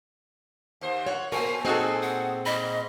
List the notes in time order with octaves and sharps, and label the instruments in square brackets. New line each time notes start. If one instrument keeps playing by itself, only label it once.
[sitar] D#2 C5
[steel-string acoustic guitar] C#5 F#5
[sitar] A#2 [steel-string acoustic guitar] A#4 C5 [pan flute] G#5 [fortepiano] C#6
[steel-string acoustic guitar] A#2 C4 [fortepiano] D#4 F#4 A4 [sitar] G#4
[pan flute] F#5
[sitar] G#2 [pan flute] D#5 [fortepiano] B5